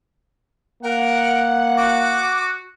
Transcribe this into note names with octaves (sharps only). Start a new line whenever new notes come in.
A#3 A#4 F#5
F#4 D6